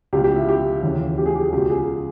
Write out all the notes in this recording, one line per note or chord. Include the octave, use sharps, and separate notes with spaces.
C#2 B2 G4
G4
E4
G4
D#2 C#3 E3
G4
G#4
G4
G#4
C#2 B2 G4
G#4